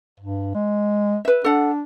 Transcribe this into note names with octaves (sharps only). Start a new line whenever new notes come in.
G2
G#3
B4 E5
D4 A4 F#5